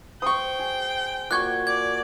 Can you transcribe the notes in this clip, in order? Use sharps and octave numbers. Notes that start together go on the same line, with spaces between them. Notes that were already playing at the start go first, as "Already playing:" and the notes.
C5 G5 C#6 D#6
G#4
A#2 F#4 C#6 D6 F#6 G#6
D5 G#6